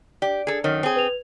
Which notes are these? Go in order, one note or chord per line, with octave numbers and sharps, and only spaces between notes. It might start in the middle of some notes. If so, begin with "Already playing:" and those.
G4 D5
G#4 A4
F#2 D#3 C#5
C4 G#4
B4 F7